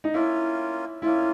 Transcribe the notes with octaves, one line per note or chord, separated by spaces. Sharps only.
D#4
A#3 C#4 E4 F4
A#3 C#4 E4 F4